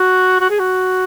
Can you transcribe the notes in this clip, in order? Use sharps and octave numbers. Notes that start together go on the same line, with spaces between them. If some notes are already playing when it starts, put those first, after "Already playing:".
Already playing: F#4
F#4
G#4
F#4